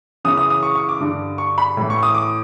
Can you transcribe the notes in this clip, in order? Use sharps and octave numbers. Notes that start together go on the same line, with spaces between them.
F#2 C#3 E3 D#6
D#6
D#6
C#6
C#6
D6
G2 D3
C#6
B5
A2 E3
C#6
D#6
D6